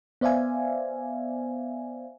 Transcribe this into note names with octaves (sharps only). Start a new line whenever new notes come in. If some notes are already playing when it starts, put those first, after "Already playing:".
B3 C5 D5 E5 F5 G#5